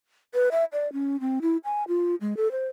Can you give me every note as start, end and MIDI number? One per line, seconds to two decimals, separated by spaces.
0.34 0.49 71
0.52 0.65 76
0.73 0.91 74
0.93 1.20 61
1.20 1.39 60
1.42 1.57 64
1.64 1.84 80
1.88 2.15 65
2.21 2.36 56
2.37 2.51 69
2.52 2.68 72